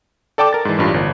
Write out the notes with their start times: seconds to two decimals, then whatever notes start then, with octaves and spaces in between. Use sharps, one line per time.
0.38 A4 D5 G5 A5 D6
0.53 A#4 A6
0.65 G#2 E3
0.78 A1 G2 F4
0.94 G1